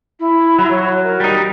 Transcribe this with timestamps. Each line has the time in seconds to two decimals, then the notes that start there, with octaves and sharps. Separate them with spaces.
0.20 E4
0.59 F#3
0.70 C#5
1.03 A#4
1.20 G3 D#4